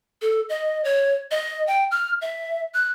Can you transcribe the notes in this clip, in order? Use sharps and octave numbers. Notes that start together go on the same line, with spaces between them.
A4
D#5
C#5
D#5
G5
F6
E5
F#6